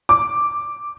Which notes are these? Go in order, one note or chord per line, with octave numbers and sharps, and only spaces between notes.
D6